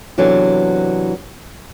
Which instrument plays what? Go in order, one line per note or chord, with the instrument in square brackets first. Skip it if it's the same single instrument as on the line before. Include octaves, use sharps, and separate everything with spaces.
[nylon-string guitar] C3 E3 F#3 B3 D4 A4